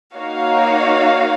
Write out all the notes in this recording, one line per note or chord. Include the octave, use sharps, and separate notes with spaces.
A#3 D#4 F#4 C#5 F5